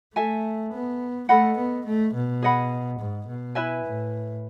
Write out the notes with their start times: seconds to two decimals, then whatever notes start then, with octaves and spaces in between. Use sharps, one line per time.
0.15 A3 A4 E5 G#5
0.73 B3
1.29 A3 A4 D#5 F#5 B5
1.57 B3
1.86 A3
2.14 B2
2.42 G#4 D#5 F#5 B5
2.99 G#2
3.27 B2
3.55 E4 B4 E5 G#5
3.84 A2